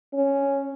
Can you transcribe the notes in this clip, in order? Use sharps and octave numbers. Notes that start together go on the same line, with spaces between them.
C#4